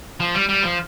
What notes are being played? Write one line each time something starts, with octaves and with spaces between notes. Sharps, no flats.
F3
G3
G3
F3